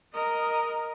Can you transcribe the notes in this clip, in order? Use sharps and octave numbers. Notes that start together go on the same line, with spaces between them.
A#4 D#5